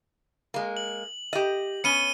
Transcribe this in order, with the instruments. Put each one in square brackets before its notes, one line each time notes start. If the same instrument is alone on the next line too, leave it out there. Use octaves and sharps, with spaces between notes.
[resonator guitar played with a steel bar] G#3 A#3
[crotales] F#7
[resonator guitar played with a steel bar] G4 D#5
[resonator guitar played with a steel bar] B3 C#4 [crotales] C#7 D#7 G7